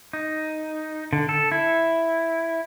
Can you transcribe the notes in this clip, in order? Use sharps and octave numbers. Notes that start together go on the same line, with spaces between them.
D#4
D3
A4
E4